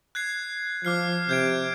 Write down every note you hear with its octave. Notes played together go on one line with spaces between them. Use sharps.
F#6 G#6 C7
F3 D6 F6 C7
C3 G6 G#6 D7